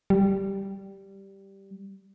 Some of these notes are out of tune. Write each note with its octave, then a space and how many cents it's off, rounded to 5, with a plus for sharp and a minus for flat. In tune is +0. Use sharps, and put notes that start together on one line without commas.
G3 -5